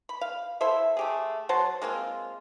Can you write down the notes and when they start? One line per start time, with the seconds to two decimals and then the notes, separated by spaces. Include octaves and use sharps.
0.09 B5
0.21 F5
0.61 E4 A4 C5 E5
0.97 A3 G4 G#4
1.49 F#3 C5 F#5 A5
1.82 G#3 A#3 C4 F4